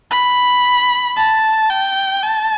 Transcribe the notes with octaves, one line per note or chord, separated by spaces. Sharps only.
B5
A5
G5
A5